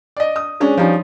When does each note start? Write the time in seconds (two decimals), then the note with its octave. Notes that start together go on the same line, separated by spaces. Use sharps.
0.17 D5 D#5
0.36 D#6
0.60 G#3 C#4 D4
0.77 F3 G3 C#4 D#4